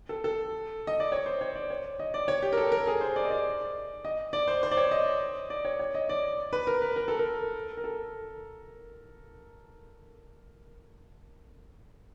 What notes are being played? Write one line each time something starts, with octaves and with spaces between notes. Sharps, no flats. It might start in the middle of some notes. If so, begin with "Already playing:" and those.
A4
A4
D#5
D5
C#5
C5
C#5
D5
C#5
D#5
D5
C#5
G4
A#4
A4
A#4
G#4
C5
D5
D#5
D5
D#5
D5
C5
C5
D5
C#5
D#5
D5
C#5
C#5
D#5
D5
B4
A#4
B4
A#4
A4
A#4
A#4
A4